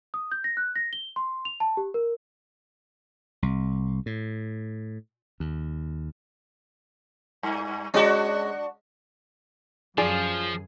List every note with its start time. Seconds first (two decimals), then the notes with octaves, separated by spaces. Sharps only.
0.14 D#6
0.31 G6
0.44 A#6
0.57 F#6
0.76 A#6
0.93 G7
1.16 C6
1.45 F7
1.60 A5
1.77 G4
1.94 A#4
3.42 C2
4.06 A2
5.40 D#2
7.43 G2
7.94 G#3 C#4 D4 F#4
9.98 F#2 F3 F4 G#4 D5